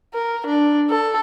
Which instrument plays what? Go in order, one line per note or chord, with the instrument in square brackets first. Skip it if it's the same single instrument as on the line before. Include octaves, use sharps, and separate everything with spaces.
[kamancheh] A#4
D4
A4